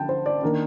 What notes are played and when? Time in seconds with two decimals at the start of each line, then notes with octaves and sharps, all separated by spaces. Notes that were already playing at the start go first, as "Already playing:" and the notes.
Already playing: D3 G5 A5
0.09 C5
0.26 D5
0.43 D#3 A#3 D4